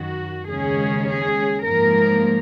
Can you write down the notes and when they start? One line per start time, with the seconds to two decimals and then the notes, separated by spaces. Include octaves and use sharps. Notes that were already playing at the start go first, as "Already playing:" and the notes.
Already playing: F#2 D#3 F#4
0.48 D#2 C#3 G#3 C#4 G#4
1.07 G#4
1.64 G#2 F3 A#3 A#4